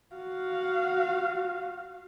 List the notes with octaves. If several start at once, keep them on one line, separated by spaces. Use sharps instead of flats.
F#4 F5